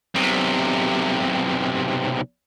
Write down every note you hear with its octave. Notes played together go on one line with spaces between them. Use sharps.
B1 C3